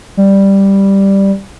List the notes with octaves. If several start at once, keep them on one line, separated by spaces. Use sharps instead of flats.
G3